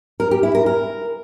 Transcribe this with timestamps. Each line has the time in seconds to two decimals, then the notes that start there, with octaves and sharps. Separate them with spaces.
0.20 A#4
0.31 G4
0.43 E4
0.55 A#4
0.66 A#4